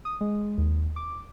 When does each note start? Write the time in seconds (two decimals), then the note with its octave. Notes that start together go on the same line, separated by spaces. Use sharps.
0.05 D#6
0.21 G#3
0.58 D#2
0.96 D6